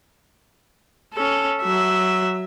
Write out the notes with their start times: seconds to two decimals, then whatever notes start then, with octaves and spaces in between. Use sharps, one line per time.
1.14 C#4 A4
1.62 F#3 E5